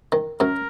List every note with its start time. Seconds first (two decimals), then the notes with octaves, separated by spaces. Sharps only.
0.12 D#3
0.40 F#2 F#3 A#4